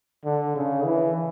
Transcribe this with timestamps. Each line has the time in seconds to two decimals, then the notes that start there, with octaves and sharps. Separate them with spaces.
0.25 D3
0.56 C#3
0.85 E3